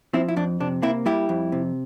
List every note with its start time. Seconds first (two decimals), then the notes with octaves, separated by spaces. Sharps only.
0.13 F3 C4 E4
0.28 E4
0.36 F2 D4
0.60 C3 D4
0.82 A#3 C4 E4
1.06 G3 E4 G4
1.29 F2
1.52 C3